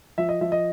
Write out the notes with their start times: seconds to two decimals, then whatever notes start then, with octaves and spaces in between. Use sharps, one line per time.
0.18 F3 E5
0.29 D#5
0.41 F3 E5
0.52 D#5